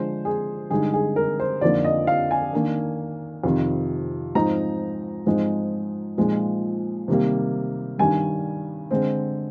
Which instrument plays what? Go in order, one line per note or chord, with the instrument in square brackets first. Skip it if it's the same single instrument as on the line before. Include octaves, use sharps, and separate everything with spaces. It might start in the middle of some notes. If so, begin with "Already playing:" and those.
Already playing: [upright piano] D3 F3 G#3 D4 C5
G#4
G2 D3 G#3 D#4 G#4
G#4
A#4
C5
F2 D3 F3 A#3 D#4 D5
D#5
F5
G#5
D#3 A#3 D4
F2 C3 D#3
G#2 F3 C4 D#4 A#5
G#2 F3 G#3 C4 D#4
A#2 F3 G#3 D#4
C3 D#3 G3 A#3
G2 D#3 G3 D4 G#5
D3 G#3 C4